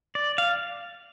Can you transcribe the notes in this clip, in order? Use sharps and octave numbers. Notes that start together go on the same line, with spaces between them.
D5
F5